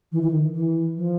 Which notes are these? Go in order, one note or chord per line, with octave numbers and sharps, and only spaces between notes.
E3
E3
D#3
E3
F3